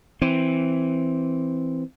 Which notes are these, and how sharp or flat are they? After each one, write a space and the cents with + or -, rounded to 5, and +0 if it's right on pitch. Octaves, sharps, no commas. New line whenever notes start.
E3 +0 C4 +0